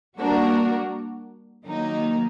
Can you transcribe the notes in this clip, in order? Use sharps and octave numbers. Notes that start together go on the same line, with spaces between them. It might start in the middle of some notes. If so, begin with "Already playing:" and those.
G3 A#3 D4 F#4 A#4
D#3 F#3 A#3 D#4